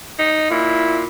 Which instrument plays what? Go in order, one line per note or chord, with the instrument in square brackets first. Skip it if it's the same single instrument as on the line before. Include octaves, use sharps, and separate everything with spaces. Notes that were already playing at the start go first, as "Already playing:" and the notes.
[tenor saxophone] D#4
[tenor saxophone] A#2 [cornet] E4